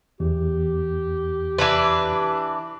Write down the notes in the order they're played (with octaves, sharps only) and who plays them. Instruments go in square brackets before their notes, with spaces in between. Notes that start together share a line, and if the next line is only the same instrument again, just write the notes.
[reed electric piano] E2 [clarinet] G4
[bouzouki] E3 D4 B4